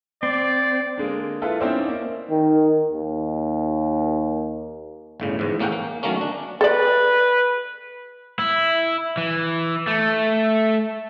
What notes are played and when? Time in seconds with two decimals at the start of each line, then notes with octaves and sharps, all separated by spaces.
0.23 C4 D5
0.97 D3 G#3 A#3
1.42 E4 F4 A4 B4
1.60 C4 C#4 D#4 E4 C5 D5
1.88 A#3
2.30 D#3
2.92 D#2
5.20 G1 A2 C#3
5.39 E2 G#2
5.59 A2 A#3 C#4 F#5 G5
5.72 A#3
6.03 D#3 F#3 A3 A#3 C#4
6.21 D4
6.61 A4 B4 D5
8.39 E4
9.17 E3
9.87 A3